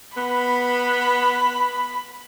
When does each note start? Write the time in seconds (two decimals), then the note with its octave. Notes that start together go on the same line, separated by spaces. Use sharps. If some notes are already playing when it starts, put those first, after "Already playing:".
0.17 B3 B5